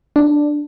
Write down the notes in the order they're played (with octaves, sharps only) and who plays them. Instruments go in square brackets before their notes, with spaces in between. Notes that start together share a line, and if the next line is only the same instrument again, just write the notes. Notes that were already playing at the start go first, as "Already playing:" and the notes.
[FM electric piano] D4